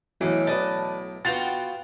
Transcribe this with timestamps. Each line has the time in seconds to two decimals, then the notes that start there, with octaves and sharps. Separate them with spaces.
0.21 B1 A2 E3 F#3 D6
0.47 B4 D5 D#5 A5
1.25 B3 F4 F#4 F5 G5 A6 F7